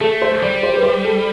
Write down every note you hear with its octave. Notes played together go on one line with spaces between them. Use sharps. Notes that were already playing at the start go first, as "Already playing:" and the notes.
A3 A4
C5
G3 D5
C5
B4
C5
A4